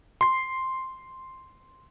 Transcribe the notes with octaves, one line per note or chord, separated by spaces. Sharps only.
C6 C7